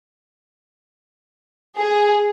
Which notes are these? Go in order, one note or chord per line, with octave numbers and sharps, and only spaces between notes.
G#4